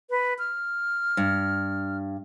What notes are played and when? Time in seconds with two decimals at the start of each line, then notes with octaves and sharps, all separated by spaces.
0.10 B4
0.39 F6
1.17 G2